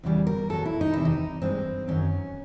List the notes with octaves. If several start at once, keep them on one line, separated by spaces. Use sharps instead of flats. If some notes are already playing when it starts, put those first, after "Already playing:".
E2 C#3 E3 G3
A#4
A#2 F#3 A4
E4
D#4
E2 C3 D#3 E4
D#4
G2 E3 G#3 C4
F#2 D#3 F#3 C#4